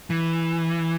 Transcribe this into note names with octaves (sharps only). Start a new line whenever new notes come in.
E3